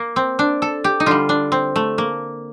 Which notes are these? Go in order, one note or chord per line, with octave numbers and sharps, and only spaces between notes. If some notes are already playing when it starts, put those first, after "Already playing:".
Already playing: A#3
C4
D4
A4
G4
D#4
D3 G3 F4
D4
C4
A3
A#3